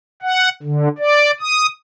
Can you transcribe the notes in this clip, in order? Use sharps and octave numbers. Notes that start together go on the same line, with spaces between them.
F#5
D3
D5
D#6